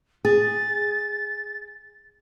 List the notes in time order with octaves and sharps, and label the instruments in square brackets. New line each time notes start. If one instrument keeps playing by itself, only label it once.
[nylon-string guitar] G#4 [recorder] A6